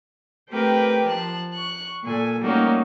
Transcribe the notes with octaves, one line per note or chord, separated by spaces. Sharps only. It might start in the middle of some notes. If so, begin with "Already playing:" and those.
A3 C4 G4 A#4 B4 G5
F3 A5 F#6
C#6 F#6
A#2 A4 G#5
G3 A3 A#3 C#4 D#4 F#4